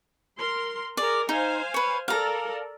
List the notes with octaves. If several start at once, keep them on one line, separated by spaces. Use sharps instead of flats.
A#4 C6
G#4 A#4 D5
D#4 C5 F5 G#5
B4 C#5
A4 A#4 D5 F5 A#5